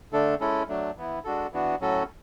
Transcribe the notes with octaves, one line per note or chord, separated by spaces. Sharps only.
D3 A3 D4 A4
G#3 C#4 E4 A4
F#3 A3 D4
E3 B3 E4
G#3 D4 F#4 A4
E3 B3 D4 F#4
A2 F#3 C#4 F#4 A4